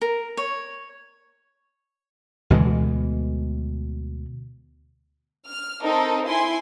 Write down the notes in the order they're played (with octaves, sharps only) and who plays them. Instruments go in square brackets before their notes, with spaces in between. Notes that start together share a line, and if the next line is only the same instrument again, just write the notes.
[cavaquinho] A#4
C#5
[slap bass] D2 B2 E3 G#3
[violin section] F6
C4 D#4 A4 A#4
E4 G#5 C6